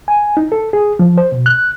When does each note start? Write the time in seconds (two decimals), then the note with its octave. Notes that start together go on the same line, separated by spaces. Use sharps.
0.08 G#5
0.37 D#4
0.52 A4
0.73 G#4
0.99 F3
1.18 C5
1.32 B2
1.46 F#6